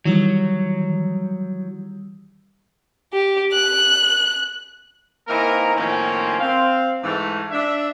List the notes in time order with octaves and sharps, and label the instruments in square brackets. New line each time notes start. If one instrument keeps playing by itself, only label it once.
[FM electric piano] D#3 E3 G3 [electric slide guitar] F#3
[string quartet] G4
F#6
[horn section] E3 A#3 C4 D#4 A#4
A2 D#3 F3 A#3 C4 C#4
C4 F5
G#2 E3 A3
D4 E5